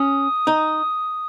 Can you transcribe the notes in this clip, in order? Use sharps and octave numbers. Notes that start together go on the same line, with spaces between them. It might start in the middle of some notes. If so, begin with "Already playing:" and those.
Already playing: C#4 D#6
D#4